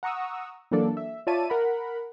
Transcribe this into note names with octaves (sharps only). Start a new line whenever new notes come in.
F#5 A#5 C#6 D#6 E6
E3 F#3 A#3 D4 A4 D5
E5
F4 C#5 D5 E5 A5 D#7
A#4 F#5 B5